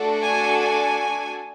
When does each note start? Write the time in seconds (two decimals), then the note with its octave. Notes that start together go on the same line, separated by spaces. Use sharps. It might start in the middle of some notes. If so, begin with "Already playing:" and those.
Already playing: A3 D4 F#4 A4
0.19 G#5
0.58 G#5